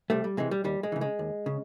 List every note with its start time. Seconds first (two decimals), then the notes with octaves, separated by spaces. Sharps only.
0.10 C2 G3 A3
0.24 G3
0.37 C3 E3 G#3
0.51 G3
0.64 D#2 G3
0.83 G#3
0.92 C#3 E3
1.01 G#3
1.19 D#2
1.46 C#3